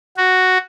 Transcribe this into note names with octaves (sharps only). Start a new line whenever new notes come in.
F#4